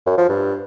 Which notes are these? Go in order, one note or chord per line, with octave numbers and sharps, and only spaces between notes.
F#2
F3
G2